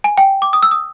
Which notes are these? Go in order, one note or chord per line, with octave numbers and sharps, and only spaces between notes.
G#5
G5
D6
D#6
E6
D#6